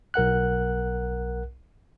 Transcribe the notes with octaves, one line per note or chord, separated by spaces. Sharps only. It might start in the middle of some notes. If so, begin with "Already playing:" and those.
B1 A#4 F#5 F#6